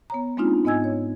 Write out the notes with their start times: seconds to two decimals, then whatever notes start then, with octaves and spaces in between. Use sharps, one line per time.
0.10 B3 C#5 A#5
0.37 G#3 A#3 C4 D4 D#4 F4
0.65 G#2 B3 D#5 G#5 E6 G#6
0.84 C#5